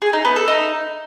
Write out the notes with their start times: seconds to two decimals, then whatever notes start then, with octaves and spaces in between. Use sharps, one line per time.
0.02 G#4
0.13 D#4
0.25 B3
0.36 A4
0.48 D#4